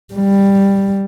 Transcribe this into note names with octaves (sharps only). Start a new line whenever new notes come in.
G3